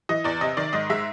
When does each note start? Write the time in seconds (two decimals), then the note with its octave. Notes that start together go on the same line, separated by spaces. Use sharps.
0.09 E3 D#5
0.24 E2 D5
0.41 C3 D#5
0.57 D#3 D5
0.73 G#2 D#5
0.90 G#3 E5